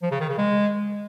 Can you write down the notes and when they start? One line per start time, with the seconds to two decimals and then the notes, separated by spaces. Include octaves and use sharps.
0.02 F3
0.11 C#3
0.20 D#3
0.29 C#3
0.38 G#3